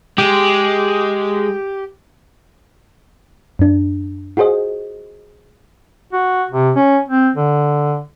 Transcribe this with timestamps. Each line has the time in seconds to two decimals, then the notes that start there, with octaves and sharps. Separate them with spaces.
0.18 G#3 G4
3.59 F#2 D4
4.37 F4 F#4 G#4 C5 D#5
6.13 F#4
6.51 C3
6.76 C#4
7.08 C4
7.36 D3